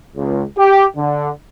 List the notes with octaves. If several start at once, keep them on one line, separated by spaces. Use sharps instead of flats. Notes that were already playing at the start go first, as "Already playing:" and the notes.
C#2
G4
D3